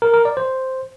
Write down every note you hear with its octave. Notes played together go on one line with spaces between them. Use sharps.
A#4
A#4
D5
C5